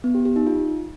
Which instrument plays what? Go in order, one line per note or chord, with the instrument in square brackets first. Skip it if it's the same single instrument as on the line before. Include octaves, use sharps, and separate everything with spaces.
[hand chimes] B3
G4
G4
D#4
F4